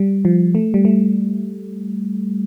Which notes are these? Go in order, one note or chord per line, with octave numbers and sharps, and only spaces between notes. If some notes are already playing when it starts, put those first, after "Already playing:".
Already playing: G3
F3
A3
G3
A3